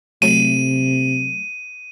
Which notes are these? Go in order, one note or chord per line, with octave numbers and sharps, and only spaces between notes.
C3 F#3 A3 D#7